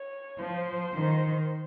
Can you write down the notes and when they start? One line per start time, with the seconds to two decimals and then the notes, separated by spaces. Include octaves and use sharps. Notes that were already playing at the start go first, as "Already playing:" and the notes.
Already playing: C#5
0.37 F3 C5
0.93 D#3